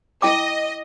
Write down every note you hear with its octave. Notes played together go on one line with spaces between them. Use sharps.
E4 D#5 G5 D6